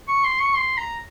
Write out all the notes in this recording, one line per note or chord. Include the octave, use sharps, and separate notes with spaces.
C#6
C6
C#6
C6
A#5